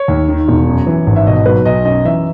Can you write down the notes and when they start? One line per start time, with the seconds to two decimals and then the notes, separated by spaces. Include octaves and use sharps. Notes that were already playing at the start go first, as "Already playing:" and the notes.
Already playing: C#5
0.08 D#2
0.29 D#3
0.48 E1
0.68 F#2
0.87 E3
1.07 G#1
1.16 E5
1.27 B2 D#5
1.46 F#3 B4
1.65 B1 D#5
1.85 F#2 D#5
2.05 E3 E5